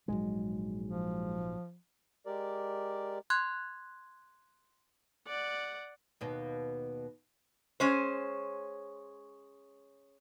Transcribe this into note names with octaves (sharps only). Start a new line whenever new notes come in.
A#1 G#2 F#3 G#3
F3
G#3 G4 A#4 D5
C6 F#6 G#6
D5 F#5
D#2 B2
G#3 C#4 C5